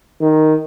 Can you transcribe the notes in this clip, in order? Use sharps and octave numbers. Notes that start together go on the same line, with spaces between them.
D#3